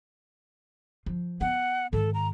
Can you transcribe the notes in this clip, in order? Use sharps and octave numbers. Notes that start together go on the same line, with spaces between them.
F3
B3 F#5
G#2 D#3 A4
A#5